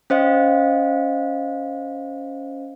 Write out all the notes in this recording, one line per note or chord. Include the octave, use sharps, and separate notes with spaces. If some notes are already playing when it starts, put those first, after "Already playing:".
C#4 C5 D#5 F5